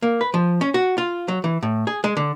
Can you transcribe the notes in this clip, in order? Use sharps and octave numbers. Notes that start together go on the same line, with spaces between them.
A#3
B4
F3
C#4
F#4
F4
F#3
E3
A2
G#4
G#3
D3